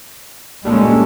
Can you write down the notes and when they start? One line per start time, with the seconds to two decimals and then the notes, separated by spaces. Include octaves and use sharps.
0.65 A#2 G3 G#3 C#4 D4 A4